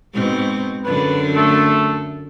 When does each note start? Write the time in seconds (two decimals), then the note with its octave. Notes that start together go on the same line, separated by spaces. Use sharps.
0.13 G#2 B2 C4
0.85 F#2 D3 D4 B4
1.36 A3